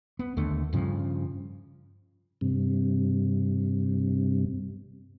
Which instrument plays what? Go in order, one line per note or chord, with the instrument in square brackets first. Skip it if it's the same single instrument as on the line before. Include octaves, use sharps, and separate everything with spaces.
[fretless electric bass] B3
D#2 D3 A3
G2 C#3 F3
[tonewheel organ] G2 C3